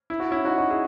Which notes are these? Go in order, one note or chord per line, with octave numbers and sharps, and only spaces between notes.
E4
F#4
C#4 E4
D#4 F#4
D#4 F#4
E4 G#4